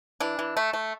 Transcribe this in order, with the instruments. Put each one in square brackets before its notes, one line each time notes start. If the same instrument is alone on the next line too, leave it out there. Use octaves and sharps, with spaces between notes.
[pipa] E3 D4
E3
A3
A3